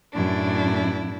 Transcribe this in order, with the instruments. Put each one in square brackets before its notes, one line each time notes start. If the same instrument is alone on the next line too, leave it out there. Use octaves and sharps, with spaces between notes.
[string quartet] F#2 A2 D4 E4